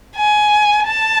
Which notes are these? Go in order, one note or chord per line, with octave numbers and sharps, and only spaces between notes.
G#5
A5